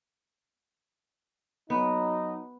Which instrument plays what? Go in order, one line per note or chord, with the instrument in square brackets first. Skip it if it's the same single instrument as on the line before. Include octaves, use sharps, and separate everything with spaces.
[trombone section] F#3 D#4 [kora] B3